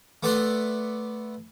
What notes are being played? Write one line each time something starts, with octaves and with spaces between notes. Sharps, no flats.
A3 B3 D5 E5 F#5 C6